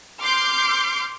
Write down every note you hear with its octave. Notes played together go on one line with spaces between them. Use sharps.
C6 D6 F6 G6 C7 D7